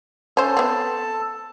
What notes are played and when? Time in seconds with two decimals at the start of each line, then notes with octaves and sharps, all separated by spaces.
0.37 C#4 A4 C5 A5
0.57 B3 C4